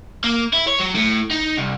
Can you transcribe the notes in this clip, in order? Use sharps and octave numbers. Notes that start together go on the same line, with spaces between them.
A#3
E4
C#5
F#3
A2
D#4
C2